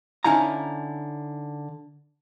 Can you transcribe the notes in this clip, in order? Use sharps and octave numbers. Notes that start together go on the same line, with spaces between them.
D3 C#4 D#4 E4 F5 A#5